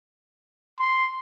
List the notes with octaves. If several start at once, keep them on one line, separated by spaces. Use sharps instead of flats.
C6